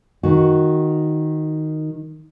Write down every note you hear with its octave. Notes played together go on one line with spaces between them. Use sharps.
D#3 F#4